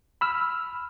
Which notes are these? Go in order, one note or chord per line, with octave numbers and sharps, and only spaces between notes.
B5 E6 F6